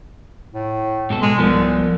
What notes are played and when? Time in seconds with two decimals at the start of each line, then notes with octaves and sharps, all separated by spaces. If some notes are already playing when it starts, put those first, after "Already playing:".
0.54 A2
1.10 G#2 B2 A4
1.22 G#3
1.39 C2 F3 B3